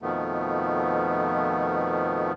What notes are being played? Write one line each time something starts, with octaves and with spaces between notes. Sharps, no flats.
F2 B2 D#3 F3 A3 B3